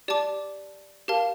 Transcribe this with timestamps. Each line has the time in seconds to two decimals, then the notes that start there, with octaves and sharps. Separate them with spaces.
0.08 G4 D5 A5 D6
1.08 G4 A#4 F5 A5